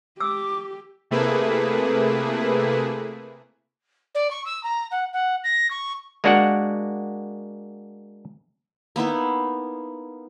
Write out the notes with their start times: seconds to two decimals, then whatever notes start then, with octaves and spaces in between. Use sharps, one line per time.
0.20 G4 D6 E6
1.11 C3 A3 A#3 E4 G#4 B4
4.15 D5
4.31 C#6
4.45 E6
4.63 A#5
4.91 F#5
5.13 F#5
5.44 A#6
5.71 C#6
6.24 G#3 A#3 D4 F#4 A#4 F#5
8.96 A#3 B3 D#4 E4